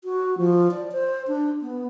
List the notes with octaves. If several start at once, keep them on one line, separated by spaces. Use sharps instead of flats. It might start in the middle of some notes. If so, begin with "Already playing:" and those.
F#4
F3
D5
C5
D4
B3